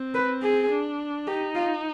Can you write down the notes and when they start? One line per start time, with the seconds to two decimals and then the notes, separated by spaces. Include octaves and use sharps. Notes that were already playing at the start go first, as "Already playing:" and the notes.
Already playing: C4
0.14 B4
0.42 G#4
0.70 D4
1.27 D#4 G4
1.55 F4